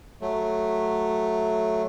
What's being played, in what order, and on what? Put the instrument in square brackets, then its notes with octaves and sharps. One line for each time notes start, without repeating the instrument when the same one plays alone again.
[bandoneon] F#3 A3